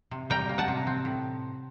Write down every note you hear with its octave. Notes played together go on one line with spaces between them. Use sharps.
C3
G3 G5 A#5
A#3
F#5 A5
C3
C4
A2